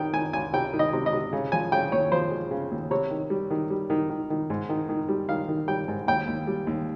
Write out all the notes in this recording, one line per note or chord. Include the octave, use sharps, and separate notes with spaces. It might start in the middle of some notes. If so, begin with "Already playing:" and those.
Already playing: C3 D#3 G5
D#3 G#5
C#2 G#5
C3 G5
D#3
D#5
C3
D#5
C3
C#3
F3 G#5
C#3 G5
D#2 C#5
F3 C5
G#3
C#3
D#2
C3 C#5
D#3
G3
D#3
G3
D#3
D#3
D#3
G#2
D#3
D#3
G3
D#3 F5
D#3
G3 G5
G#2
D#2 G5
D#2
G3
D#2